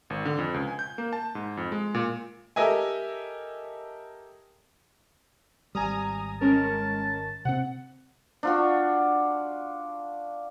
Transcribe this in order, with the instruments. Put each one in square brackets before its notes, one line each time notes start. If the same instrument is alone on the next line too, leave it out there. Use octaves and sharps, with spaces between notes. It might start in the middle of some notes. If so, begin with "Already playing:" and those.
[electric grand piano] G#1
D3
F2
C#2
G#5
G6
A#3
A5
G#2
F2
G#3
A#2
[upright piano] G4 A4 A#4 D#5 E5 G#5
[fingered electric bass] G#1 G3 [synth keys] G#5 A#5 D#6
[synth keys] G#3 C#4 A#4 [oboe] A5
[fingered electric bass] C3 C4 [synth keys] F#5
[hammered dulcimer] D4 F4 F#4